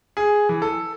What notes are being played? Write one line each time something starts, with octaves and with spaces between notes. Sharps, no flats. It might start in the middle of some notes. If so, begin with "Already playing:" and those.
G#4
E3
A4